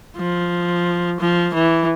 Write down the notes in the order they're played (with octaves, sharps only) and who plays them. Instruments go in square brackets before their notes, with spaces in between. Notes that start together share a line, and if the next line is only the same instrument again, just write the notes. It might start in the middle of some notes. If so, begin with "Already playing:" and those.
[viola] F3
F3
E3